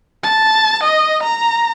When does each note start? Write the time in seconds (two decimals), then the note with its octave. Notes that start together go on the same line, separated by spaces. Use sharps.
0.23 A5
0.84 D#5
1.24 A#5